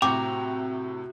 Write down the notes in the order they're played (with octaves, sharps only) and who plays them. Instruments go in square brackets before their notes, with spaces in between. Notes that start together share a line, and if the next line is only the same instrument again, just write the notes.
[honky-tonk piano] A2 C3 [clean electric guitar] F#4 A#5 [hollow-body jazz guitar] G5 [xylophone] D6